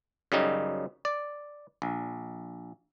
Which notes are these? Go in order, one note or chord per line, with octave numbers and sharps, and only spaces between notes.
F#2 C#3 G3 D#4
D5
A#1